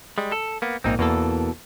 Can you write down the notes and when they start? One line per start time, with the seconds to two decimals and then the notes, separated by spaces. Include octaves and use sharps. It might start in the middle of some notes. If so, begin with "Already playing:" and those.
0.18 G3 G#3
0.32 A4
0.62 A#3 B3
0.84 A#1 G#2 A#3 C4 D#4
0.99 E2 B2 E3 A#3 A4